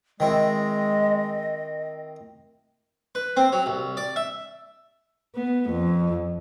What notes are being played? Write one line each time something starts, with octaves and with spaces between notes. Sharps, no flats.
D#3 G#3 C4 E4 D#5
B4
C4
F#3
C2
D5
E5
B3
F2